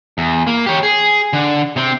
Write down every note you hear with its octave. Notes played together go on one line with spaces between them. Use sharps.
E2
A#3
G4 C#5
G#4
D3
C3 C4